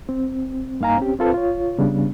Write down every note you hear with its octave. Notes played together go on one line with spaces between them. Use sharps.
C4
G2 A#3 D#4 F5 G#5 A#5
C4 C#4 G4
C4 F4 A4 B4 C5
F4 C#5
C#3 G3 B3 D4